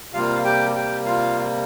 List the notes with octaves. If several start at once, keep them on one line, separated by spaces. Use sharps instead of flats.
C3 G3 A#3 F4 F5
G4 G5
G4 G5
F4 F5